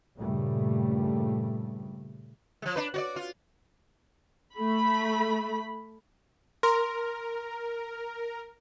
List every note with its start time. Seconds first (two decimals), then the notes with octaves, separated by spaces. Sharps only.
0.19 G2 A#2 C#3 G3 A3
2.62 F3 G#3
2.76 D4 B4
2.94 F#4 C#5 D5
3.16 F4
4.55 A3 B5
6.63 A#4 C6